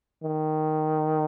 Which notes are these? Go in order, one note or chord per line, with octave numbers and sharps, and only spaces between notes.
D#3